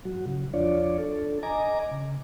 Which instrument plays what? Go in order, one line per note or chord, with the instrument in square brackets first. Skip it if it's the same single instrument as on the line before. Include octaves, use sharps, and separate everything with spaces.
[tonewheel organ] G2 F#3 F#4
C#3
E2 F3 D4 F4 C#5 D5
D4 A4
D#5 G#5 A#5 D6
C#3